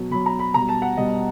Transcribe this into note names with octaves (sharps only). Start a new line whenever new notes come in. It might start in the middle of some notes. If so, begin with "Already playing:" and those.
Already playing: B2 F#3
B2 F#3 B5
A#5
B5
B2 G3 A#5
A5
F#5
B2 G3 D#5